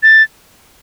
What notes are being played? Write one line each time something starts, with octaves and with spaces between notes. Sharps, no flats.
A6